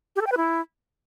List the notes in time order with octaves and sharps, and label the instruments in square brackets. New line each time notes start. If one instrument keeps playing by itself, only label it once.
[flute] G4
A4
G5
B4
E4